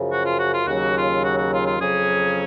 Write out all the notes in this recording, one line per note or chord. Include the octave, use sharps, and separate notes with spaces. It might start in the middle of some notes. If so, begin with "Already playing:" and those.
Already playing: F#2 C#3 F3
F#4
F4
F#4
F4
D#2 C#3 F#3 F#4
F4
F#4
F#4
F4
F4
F2 C#3 F#3 C#4 G#4